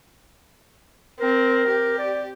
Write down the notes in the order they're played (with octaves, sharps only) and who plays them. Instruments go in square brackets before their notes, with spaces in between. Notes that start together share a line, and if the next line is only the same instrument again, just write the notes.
[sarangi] C4 [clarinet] A#4
[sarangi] G4
[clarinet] D5